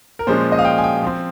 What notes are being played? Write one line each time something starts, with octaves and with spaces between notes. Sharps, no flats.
A#4
A#2 F3 G#3 C#4 C5
D#5
F5
G5
G#5
G5
F3 C4